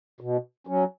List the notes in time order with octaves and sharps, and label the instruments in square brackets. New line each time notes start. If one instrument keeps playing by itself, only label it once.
[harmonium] B2
F#3 C#4